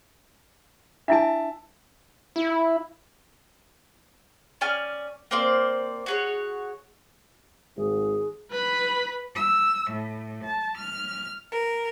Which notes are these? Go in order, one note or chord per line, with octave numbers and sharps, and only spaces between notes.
D4 E4 E5 G#5 A5
E4
C#4 D5 G#5 F6
A#3 C4 C5 D5
F#4 G#4 C#5
G#1 G#4
B4 B5
E6
A2
A5
F6
A#4